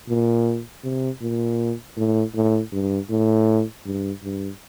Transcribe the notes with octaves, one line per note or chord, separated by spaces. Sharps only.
A#2
C3
A#2
A2
A2
G2
A2
G2
G2